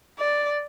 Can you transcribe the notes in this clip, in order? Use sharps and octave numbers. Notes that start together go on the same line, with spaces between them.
D5